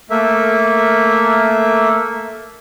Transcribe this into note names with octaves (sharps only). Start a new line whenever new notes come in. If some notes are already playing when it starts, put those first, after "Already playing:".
A3 A#3 E5